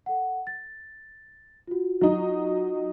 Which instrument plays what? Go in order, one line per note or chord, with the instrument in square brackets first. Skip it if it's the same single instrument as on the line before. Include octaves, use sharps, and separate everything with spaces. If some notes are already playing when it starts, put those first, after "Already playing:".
[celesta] A4 F#5
A6
F4 F#4
[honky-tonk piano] F#3 D#4